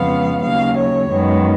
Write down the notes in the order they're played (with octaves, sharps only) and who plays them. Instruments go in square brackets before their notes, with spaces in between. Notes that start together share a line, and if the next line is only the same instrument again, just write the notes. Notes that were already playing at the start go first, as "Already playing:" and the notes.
Already playing: [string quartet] F2 C#3 G#3 B3 F5
D#2 C#3 F#3 F5
C#5
F#2 D#3 G#3 B3